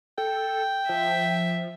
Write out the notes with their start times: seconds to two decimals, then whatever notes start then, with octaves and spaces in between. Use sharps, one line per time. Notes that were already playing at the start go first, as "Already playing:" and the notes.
0.18 A4 G5
0.89 F3 E5